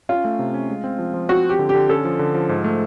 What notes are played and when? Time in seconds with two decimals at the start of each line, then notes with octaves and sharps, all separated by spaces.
0.09 C#4 F4
0.25 A3
0.39 C3
0.54 C#4
0.69 G#3
0.84 C4
0.99 F3
1.14 F3
1.29 C4 F#4
1.44 C4 G4
1.59 D3
1.69 G4
1.74 D3
1.89 C#4 A4
2.05 F3
2.19 D3
2.34 F3
2.49 G#2
2.64 A3